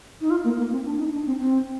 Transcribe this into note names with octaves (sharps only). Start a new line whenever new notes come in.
D#4
F4
A#3
A#3
C4
D4
D#4
D4
C4
C4